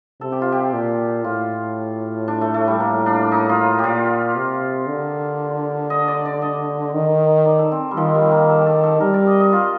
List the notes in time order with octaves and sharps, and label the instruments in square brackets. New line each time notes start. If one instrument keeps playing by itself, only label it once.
[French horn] C3 [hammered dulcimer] A4
[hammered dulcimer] G4
F4
G4
[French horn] A#2
[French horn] A2 [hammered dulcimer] F4
[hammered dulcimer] D4
A3
A3
G3
[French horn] A2 [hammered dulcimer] A#3
[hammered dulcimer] D4
D#4
F4
[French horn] A#2 [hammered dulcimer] F4 G4
[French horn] C3
D3
[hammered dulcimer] D#5
D5
D5
D#5
[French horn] D#3
[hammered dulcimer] D5
A4
C4
G3
[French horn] D#3 [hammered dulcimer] F3
[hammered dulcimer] G3
A#3
A4
G4
A4
A4
[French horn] G3 [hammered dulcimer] A#4
[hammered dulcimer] D5
D#5
D#5
F4